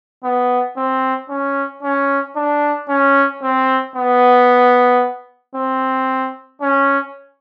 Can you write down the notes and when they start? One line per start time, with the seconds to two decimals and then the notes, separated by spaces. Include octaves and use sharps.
0.24 B3
0.77 C4
1.30 C#4
1.83 C#4
2.36 D4
2.89 C#4
3.43 C4
3.95 B3
5.55 C4
6.61 C#4